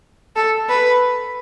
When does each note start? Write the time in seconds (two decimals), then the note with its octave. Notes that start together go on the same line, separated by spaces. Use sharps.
0.36 A4
0.69 B4